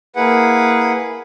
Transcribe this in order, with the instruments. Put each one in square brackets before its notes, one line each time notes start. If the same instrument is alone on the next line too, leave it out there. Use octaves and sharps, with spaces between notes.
[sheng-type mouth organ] A#3 E4 G#4 B4 F#5